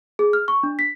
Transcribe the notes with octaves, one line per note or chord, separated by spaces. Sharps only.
G#4
F6
C#6
D4
B6